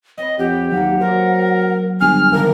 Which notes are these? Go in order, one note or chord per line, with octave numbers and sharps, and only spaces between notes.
C4 C#5 D#5 B5
F2 G4 F#5
D#2 F#3 A#3 F#5
F#3 A#4 C5
G1 G#5 F6
G#1 D3 A#3 A#4